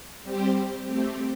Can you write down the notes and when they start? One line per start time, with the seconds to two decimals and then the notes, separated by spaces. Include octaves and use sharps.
0.23 G3 C4 G4 C5
0.86 A3 C4 G4